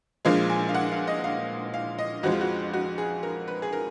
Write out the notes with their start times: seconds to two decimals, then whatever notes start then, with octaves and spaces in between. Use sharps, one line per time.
0.25 A#1 A#2 F3 G#3 F5
0.50 G#5
0.69 F5
0.75 F#5
0.91 F5
1.08 D#5
1.24 F5
1.74 F5
1.99 D#5
2.23 F2 F3 G#3 F#4
2.32 F4
2.41 F#4
2.74 F#4
2.98 G#4
3.23 A#4
3.48 B4
3.62 G#4
3.73 A#4